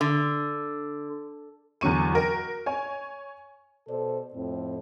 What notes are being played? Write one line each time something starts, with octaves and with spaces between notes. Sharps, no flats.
D3
E2 D3 F#3 C#6 D#7
F#4 A#4
C#5 G#5
B2 A4 C5 D5
F2 A2 C4